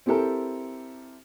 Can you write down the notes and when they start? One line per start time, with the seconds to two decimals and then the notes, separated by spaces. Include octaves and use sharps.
0.06 C4 E4 G4 A4 A#4